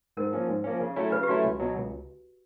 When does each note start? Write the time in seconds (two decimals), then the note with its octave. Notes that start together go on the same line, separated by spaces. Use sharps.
0.17 G#2 A#4
0.33 F3 A#3 C#4
0.49 G#2
0.64 F3 A#3 C#4
0.81 C#3
0.96 F#3 A3 C#4 E4
1.12 C#3 B4
1.23 G4
1.28 F#3 A3 C#4 E4 F#4
1.44 C#2
1.60 B2 F#3
1.76 C#2